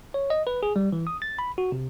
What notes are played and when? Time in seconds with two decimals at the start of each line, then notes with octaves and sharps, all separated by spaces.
0.14 C#5
0.30 D#5
0.47 B4
0.63 G#4
0.76 G3
0.93 E3
1.07 D#6
1.22 A6
1.39 B5
1.58 F#4
1.72 C3